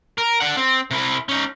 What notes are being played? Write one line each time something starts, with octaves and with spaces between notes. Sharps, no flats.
A#4
D4 F#5
C4
C3 E4
C#4 D#4